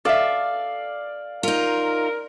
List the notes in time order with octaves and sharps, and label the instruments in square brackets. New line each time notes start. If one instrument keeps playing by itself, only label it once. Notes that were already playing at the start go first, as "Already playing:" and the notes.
[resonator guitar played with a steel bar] A4 E5 [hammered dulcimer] D5 F5
[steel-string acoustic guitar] D#4 F4 [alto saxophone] A#4